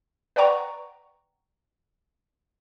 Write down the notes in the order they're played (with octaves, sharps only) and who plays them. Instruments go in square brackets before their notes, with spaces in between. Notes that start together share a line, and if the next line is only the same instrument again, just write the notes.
[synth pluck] B4 D5 F#5 G5 A#5 C#6